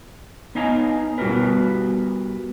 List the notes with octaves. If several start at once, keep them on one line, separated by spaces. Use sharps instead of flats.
B3 D#4 D#5 F5 G#5 A#5
G3 B3 F#4 G4 A#4 B4